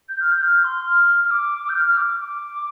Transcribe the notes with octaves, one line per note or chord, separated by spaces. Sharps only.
G6
F6
G6
F6
C6
F6
F6
D6
G6
F6
F6
D6
D6